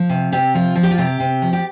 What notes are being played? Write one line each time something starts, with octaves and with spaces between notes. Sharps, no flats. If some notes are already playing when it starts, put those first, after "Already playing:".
Already playing: F3
C3
C3 G4
F3 F4
F3
G4
F4
C3 G4
C3
F3
G4